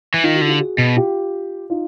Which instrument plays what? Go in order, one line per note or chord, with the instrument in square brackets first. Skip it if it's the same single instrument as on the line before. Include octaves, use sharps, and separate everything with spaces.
[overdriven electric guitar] E3
[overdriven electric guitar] D#3 [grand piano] D#4 F4
[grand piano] E4 F#4
[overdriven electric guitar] D3
[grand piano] F4 G4
F#4 G#4
[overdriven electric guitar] B2
[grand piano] F4 G4
D#4 F4